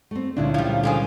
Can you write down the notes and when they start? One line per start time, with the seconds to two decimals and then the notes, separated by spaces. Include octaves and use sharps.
0.11 A3 C4
0.36 C#2 A#2 D3 D4 E4 C#5
0.54 F3 G3
0.83 D3 F3 G#4